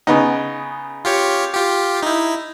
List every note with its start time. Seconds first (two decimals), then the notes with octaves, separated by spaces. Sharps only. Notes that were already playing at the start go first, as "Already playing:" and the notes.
0.07 C#3 B3 D#4
1.05 F4 G4 C#5
1.54 F4 G4
2.03 D#4 E4